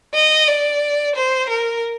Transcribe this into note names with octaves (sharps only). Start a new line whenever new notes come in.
D#5
D5
C5
A#4